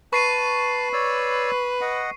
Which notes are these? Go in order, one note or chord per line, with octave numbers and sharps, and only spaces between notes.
B4 A5 C#6 C7 D#7
C#5 D5 E6
D#5 F#5